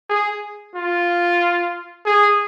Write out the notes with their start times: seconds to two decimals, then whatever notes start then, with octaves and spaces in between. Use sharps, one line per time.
0.10 G#4
0.76 F4
2.05 G#4